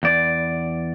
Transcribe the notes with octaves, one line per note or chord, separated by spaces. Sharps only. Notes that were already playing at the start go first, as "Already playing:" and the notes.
E2 D5